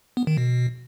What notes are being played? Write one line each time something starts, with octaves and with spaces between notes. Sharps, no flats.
B3
D#3
B2